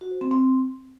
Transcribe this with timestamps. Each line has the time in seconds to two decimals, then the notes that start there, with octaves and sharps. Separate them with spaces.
0.01 F#4
0.11 C5
0.21 C4
0.31 C4